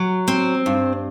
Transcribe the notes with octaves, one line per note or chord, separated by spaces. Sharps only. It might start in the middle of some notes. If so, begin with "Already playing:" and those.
Already playing: F#3
C4
G2